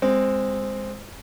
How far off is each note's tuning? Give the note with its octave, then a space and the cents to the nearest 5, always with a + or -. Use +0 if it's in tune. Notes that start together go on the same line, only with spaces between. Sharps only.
G#3 -15 C4 +0